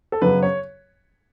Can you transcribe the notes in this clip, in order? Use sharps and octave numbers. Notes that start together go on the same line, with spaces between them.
A4
F#2 C#3 F#3 B3 B4
C#5